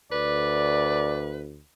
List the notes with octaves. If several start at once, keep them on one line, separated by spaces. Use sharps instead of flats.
D2 B4 D5